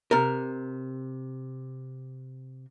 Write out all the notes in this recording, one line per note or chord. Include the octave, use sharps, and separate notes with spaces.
C3 A#4